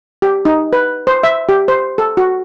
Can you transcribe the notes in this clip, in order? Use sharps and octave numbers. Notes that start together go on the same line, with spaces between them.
G4
D#4
B4
C5
E5
G4
C5
A4
F#4